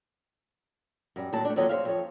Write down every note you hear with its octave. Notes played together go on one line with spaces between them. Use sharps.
F#2 G3
D#2 A2 F#3 A5
A3 D4
D#2 D3 F3 F#3 C#5 D#5
C5 C#5 E5 F5
F2 F3 C#5